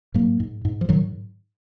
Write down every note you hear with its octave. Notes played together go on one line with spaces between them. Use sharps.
G#2 F#3 A#3
G#2
G#2
F3
G#2 D#3 F#3